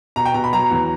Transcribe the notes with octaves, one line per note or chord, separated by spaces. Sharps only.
B2 A#5
G5
B2 A#5
B5
F#3 A#5
E2